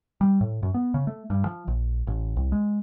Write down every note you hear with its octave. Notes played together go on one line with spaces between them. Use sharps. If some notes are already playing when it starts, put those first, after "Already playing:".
G3
A2
F#2
B3
C#3
A3
G2
F3
A#1
A1
C2
G#3